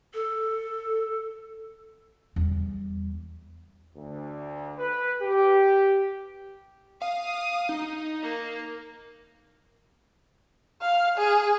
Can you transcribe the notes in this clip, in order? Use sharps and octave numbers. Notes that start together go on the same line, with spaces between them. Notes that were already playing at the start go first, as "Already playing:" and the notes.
A4
E2 G3
D2
B4
G4
F5 D#6
D#4
A#3
F5
G#4